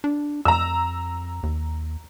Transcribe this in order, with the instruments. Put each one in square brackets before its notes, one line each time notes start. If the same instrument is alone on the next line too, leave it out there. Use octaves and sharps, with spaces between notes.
[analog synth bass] D4
[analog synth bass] F2 [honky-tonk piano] A#5 E6
[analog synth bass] D#2